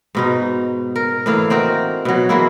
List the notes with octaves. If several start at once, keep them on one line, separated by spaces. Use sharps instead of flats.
G#2 B2 D#4
A#4
A2 E3 A#3 F5
C4 D#4 F#4 A#4
B2 F#3
E3 G#3 A#3 E4